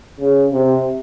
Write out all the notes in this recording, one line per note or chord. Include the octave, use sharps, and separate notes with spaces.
C#3
C3